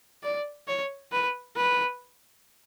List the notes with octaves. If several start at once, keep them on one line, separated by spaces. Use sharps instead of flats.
D5
C#5
B4
B4